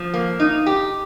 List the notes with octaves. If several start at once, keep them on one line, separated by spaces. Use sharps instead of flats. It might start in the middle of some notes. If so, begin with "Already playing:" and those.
Already playing: F3
A#3
D#4
G4